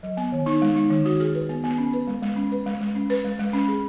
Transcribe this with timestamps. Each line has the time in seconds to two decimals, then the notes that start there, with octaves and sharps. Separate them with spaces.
0.03 F#3
0.17 B3
0.32 D#3
0.46 D#4
0.62 G#3
0.76 D#4
0.90 D#3
1.05 F#4
1.20 G#4
1.35 B4
1.49 B3
1.64 B3
1.78 C#4
1.93 B4
2.07 G#3
2.22 G#3
2.36 C#4
2.52 B4
2.66 G#3
2.81 G#3
2.95 C#4
3.10 B4
3.25 G#3
3.39 G#3
3.53 C#4
3.68 G#4